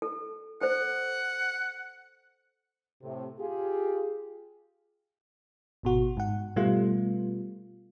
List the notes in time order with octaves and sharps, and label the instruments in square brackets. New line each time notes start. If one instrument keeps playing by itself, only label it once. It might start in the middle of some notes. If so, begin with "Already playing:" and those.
[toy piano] A4
[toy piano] A4 C5 [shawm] F#5
[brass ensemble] A2 C3
F4 G4 G#4
[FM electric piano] G#1 B2 F#4
G#2 F#5
B2 G3 A3 B3 F4